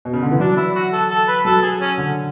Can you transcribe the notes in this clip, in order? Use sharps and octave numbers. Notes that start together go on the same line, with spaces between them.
B2
C#3
D3
E3
F#3 D4
E4
F#4
A4
A4
B4
F#3 A4
G#4
C#4
D3